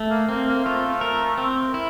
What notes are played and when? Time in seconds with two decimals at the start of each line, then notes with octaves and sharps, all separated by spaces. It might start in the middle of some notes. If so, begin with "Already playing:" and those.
Already playing: A3
0.10 A#3
0.29 A#3 C4
0.47 A#3
0.65 A3 F4
1.01 A#4
1.38 C4
1.74 E4